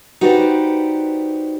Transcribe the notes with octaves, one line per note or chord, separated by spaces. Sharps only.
D#4 F#4 G4 B4 C5 D5